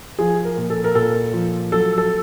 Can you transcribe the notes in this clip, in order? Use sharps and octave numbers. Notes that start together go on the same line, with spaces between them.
F3 G#4
A#4
A#2
A4
A#4
A#2 A4
F3
F#3 A4
A4